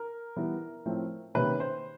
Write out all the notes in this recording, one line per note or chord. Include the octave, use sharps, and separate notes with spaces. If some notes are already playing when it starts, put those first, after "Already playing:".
Already playing: A#4
E3 G3 B3
A2 F3 A3 C4
C3 D#3 G3 A#3 C#4 B4
C5